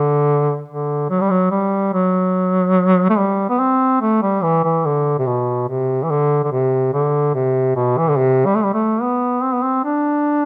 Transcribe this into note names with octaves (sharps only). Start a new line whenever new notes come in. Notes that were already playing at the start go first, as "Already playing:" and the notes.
Already playing: D3
D3
F#3
G3
F#3
G3
F#3
A3
G3
B3
C4
A3
G3
E3
E3
D3
C3
B2
C3
E3
D3
D3
C3
D3
C3
B2
E3
D3
C3
G3
A3
G3
A3
B3
C4
B3
C4
D4